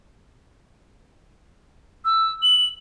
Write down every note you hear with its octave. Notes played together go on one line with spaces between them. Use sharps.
E6
F#7